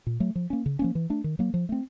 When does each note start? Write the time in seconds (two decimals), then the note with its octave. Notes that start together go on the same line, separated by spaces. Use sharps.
0.07 A#2
0.20 F#3 A3
0.35 F3
0.50 A#3 C#4
0.66 C#3
0.79 F3 A#3 C#4
0.95 E3
1.10 A3 D4
1.24 D#3
1.39 F#3 A#3
1.54 F3
1.69 A3 C4